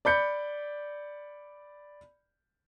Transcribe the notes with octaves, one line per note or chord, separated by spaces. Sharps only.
D5 B5 G6 C#7